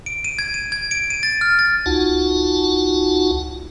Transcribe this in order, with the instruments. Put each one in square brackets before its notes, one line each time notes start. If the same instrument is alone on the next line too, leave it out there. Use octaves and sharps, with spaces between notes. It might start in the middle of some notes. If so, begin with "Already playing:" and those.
[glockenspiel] D7
D#7
G#6
D#7
G#6
D7
D#7
A6
F6
A6
[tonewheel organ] C#2 D#4 F4 F#4 F#5 A5